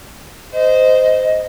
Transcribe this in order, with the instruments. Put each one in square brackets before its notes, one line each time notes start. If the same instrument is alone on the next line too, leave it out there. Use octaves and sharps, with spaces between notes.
[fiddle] C5 [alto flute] D#5